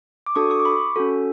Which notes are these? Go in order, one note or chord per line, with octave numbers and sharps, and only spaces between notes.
D6
D4 F#4 A4 C#6 D#6
C#6 D#6
D6
B5 C#6
C#4 F#4 A4